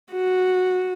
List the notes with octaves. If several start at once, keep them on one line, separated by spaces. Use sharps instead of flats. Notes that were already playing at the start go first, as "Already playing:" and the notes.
F#4